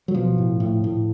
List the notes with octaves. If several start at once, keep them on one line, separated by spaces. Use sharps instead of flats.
F#3
B2 F3
A2
A2
A2